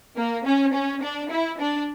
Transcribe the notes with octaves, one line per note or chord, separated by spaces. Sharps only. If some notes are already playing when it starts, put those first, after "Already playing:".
A#3
C#4
C#4
D4
E4
D4